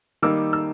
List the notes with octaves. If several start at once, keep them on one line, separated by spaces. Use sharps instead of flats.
D#3 G3 A#3 D#4 D6 E6
E6